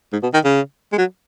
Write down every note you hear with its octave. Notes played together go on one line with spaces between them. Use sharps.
G#2
B2
D#3
C#3
G#3
F#3